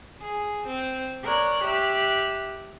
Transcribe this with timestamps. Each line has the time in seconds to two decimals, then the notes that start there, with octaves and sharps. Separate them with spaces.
0.20 G#4
0.67 C4
1.23 A#4 C#5 D5 F#6
1.64 G4 E5 F#6